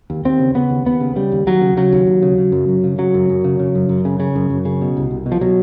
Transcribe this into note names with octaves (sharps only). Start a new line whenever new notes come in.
D#2
D#2 C4
C#3
C#3 B3
D#2
D#2 B3
C#3
C#3 G3
D#2
D#2 F#3
C#3
C#3 F#3
D#2
D#2
C#3
C#3
F#2
F#2
C#3
C#3 F#3
F#2
F#2
C#3
C#3
F#2
F#2
C#3
C#3
F#2
F#2
C#3
B2
C2
C2
B2
F3
B2 F#3